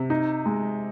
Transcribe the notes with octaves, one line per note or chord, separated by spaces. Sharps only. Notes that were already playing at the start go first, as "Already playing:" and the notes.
Already playing: C3
D#4
G#3